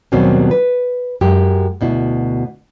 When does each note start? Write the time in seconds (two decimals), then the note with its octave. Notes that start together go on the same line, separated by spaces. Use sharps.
0.12 D#2 B2 F#3 G3 C4 C#4
0.51 B4
1.21 F#2 G#3 G4
1.81 D2 B2 E4